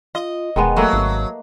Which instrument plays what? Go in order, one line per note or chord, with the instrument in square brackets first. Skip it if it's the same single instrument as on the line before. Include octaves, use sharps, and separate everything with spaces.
[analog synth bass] F4 [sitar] D#5
[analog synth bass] E1 [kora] D#3 G#3 B3
[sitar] F#3 [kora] A3 A#3 B4
[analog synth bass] G#1